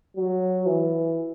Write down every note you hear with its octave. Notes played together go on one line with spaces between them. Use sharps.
F#3
E3